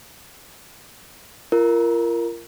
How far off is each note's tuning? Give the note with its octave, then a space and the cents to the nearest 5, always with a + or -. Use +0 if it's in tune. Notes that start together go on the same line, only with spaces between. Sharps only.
F4 -35 A#4 +0